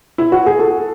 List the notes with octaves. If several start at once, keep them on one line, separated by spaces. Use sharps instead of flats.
E4
F#4
G#4
A4